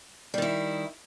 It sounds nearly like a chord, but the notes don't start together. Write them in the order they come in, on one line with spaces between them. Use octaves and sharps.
G3 D#3 E4